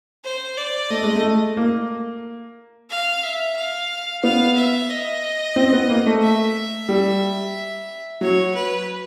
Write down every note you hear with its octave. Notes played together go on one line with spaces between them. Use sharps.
C5
D5
A3 D#5
G#3
A3
A#3
F5
E5
F5
B3 F5
E5
D#5
C4
B3
A#3
A3
E5
G3
F#3 C#5
B4